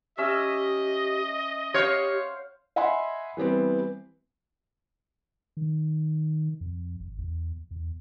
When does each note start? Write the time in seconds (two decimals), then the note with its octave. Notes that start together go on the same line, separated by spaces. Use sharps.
0.18 C#4 G4 D#5 E5 E6
1.74 G4 C5 C#5 F5 F#5
2.76 D#5 E5 F#5 G#5 B5 C6
3.37 E3 G3 B3 C4
5.57 D#3
6.61 F2
7.00 G#1
7.19 E2
7.71 E2